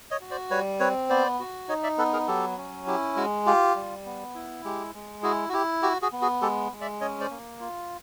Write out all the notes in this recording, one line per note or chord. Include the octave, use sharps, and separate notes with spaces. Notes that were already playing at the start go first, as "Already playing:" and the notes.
C#5 D#5
F#4
C5 D5
G3 B4 C#5
C4 B4 C#5
B3 C5 D5
F#4
D#4 C#5 D#5
D5 E5
B3 A4 B4
G#4 A#4
F#3 G4 A4
C#4
E4 G4
G#3 F#4
F4 G4
G3
B3
E4
G#3 G4
G#3
E4 F#4 G#4
F#4
E4 G4
F#4 G4
F#4 G#4
B3
F#4 G#4
G#3 G4 A4
G#3
D5 E5
C#4 C#5 D#5
C5 D5
A#3
F4